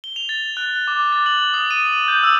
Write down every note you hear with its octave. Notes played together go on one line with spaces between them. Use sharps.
G7
F7
A6
F#6
D6
A6
F#7
D#6
D#7
G6
E6